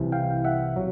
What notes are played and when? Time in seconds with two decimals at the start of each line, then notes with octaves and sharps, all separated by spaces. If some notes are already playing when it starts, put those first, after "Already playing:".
Already playing: C2 C3 E3
0.12 F5 G5
0.45 E5 F#5
0.76 F#3